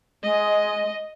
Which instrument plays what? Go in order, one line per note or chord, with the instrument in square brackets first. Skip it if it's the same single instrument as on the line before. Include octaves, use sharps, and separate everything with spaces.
[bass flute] G#3 [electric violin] D#5